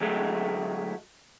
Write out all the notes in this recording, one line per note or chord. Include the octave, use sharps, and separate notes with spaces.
D2 F#3 G#3 A3